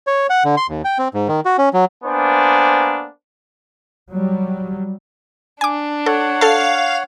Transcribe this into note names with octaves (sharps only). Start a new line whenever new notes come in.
C#5
F#5
D3
C6
D#2
G5
C4
G#2
D#3
F#4
C#4
F#3
A#3 B3 D4 C5 G#5
F#3 G3
D4 G#5 D6
A4 C#5 F#5
A4 F5 A5